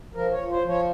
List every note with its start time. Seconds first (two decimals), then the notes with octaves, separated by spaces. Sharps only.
0.14 F3 A#4
0.31 C#5
0.38 F3
0.50 C5
0.62 F3
0.68 C#5